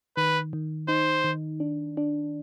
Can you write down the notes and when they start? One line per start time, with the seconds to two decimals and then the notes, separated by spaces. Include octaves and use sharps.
0.17 D#3 B4
0.53 D#3
0.88 D#4 C5
1.24 D#3
1.60 D4
1.97 D4